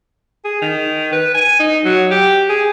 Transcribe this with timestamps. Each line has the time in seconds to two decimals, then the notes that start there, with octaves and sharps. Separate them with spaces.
0.45 G#4
0.61 D#3
1.12 B4
1.34 G#5
1.60 D#4
1.85 F#3
2.11 G4
2.49 G#4